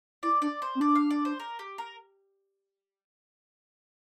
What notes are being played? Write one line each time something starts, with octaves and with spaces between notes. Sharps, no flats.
E4 D5
D4 D5
C5
C4
D4 D5
F5
D5
C5
A#4
G4
A#4